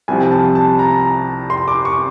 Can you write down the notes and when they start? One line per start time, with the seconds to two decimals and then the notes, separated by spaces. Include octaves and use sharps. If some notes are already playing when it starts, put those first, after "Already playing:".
0.08 C2 C3 F3 G#5
0.31 A5
0.55 A5
0.79 A#5
1.50 C6
1.68 D6
1.85 C#6